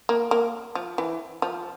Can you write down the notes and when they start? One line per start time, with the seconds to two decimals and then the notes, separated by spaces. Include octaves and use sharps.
0.09 A#3
0.31 A#3
0.75 F3
0.98 E3
1.42 F3